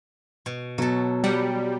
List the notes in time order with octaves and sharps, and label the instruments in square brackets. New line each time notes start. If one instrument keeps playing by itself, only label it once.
[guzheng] B2
[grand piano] B2 [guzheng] F#3 A4
[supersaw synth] G3 [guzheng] F#5